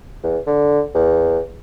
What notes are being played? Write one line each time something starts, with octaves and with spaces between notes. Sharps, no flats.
E2
D3
E2